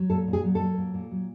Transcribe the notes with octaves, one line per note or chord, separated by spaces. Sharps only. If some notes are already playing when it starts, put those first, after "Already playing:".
Already playing: F#3
A#2 A4
A#2
G#4
F#3
A4
F#3
A#2
A#2
F#3